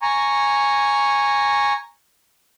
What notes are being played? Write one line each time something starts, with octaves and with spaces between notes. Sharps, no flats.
G#5 A#5 C#6